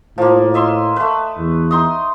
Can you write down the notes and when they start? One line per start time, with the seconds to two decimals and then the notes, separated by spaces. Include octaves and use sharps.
0.18 A2 F3 A#3
0.54 D#5 E5 C6
0.96 A3 B4
1.38 E2
1.71 D#4 C6 D#6